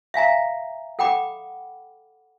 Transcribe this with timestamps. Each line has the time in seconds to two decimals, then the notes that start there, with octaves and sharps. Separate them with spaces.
0.14 E5 F5 G#5 A#5
0.99 A4 F#5 G5 B5 D6